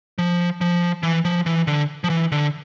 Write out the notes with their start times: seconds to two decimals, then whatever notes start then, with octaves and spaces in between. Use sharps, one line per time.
0.18 F3
0.61 F3
1.03 E3
1.25 F3
1.46 E3
1.67 D3
2.04 F3
2.10 E3
2.32 D3